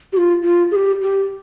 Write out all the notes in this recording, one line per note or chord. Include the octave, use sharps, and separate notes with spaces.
G4
F4
F4
G#4
G4
G4